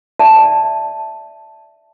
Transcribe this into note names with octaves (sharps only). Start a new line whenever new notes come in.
D5 E5 A5